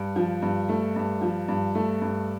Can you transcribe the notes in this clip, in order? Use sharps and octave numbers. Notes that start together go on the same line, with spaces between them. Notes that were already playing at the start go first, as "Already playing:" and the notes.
Already playing: G2
F3
G2
A3
G2
F3
G2
A3
G2